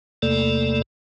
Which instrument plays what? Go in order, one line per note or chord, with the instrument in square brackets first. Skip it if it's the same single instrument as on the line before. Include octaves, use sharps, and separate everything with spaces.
[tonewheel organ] E2 C3 A3 A#3 A4 D5